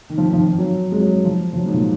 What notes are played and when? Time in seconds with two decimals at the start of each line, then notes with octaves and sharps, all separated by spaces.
0.10 D#3
0.18 F3
0.26 D#3
0.33 F3
0.42 D#3
0.58 F#3
0.92 G#3
0.99 F#3
1.08 G#3
1.24 F3
1.53 F3
1.57 F#3
1.66 G#2
1.73 A#2